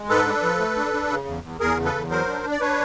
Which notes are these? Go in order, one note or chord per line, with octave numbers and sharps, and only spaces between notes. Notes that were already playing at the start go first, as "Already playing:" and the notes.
Already playing: G#3
G#2 A4 B4
D4
F3
A3
D4
D4
C#3
E2
E2
E2 G#4 A#4
C#3
A4 B4
E2
F#3 A#4 C5
D4
D4
D5
D4 B4 C#5